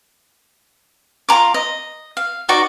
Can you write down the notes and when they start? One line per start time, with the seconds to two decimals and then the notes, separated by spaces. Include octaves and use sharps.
1.29 F4 A4 A#5 D6
1.54 D#5
2.17 F5
2.49 D#4 F#4 D5